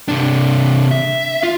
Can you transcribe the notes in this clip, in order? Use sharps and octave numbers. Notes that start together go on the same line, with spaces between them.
C3 D4
E5
F4